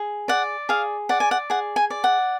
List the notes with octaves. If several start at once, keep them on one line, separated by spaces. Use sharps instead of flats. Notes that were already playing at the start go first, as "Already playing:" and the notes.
Already playing: G#4
D5 F#5
G#4 F5
D5 F#5
G#5
F#5
G#4 F#5
G#5
D5
F#5